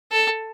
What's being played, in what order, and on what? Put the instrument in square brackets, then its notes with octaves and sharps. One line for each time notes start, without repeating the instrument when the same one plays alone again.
[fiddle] A4